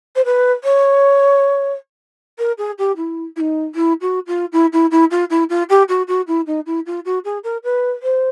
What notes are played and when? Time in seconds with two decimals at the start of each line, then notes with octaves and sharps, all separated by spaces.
0.15 C5
0.25 B4
0.64 C#5
2.38 A#4
2.58 G#4
2.78 G4
2.97 E4
3.36 E4
3.40 D#4
3.75 E4
4.01 F#4
4.27 F4
4.52 E4
4.72 E4
4.91 E4
5.11 F4
5.30 E4
5.49 F4
5.69 G4
5.89 F#4
6.08 F#4
6.27 E4
6.46 D#4
6.66 E4
6.86 F4
7.05 F#4
7.24 G#4
7.44 A#4
7.63 B4
8.03 C5